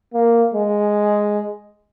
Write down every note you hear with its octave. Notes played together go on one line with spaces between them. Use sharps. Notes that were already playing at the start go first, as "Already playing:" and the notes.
A#3
G#3